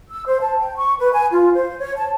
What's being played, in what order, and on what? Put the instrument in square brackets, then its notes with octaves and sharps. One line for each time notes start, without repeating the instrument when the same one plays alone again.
[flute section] E6
C5
A5
G5
C#6
B4
G#5
F4
C5
C#5
A5